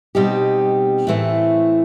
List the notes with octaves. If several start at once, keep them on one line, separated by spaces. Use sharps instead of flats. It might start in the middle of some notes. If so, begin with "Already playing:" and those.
B2 G3 C4 D#4 G4
A2 E3 A3 C4